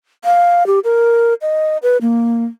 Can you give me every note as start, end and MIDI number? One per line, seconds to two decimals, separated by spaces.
0.25 0.66 77
0.67 0.79 67
0.84 1.34 70
1.42 1.77 75
1.83 1.97 71
2.01 2.45 58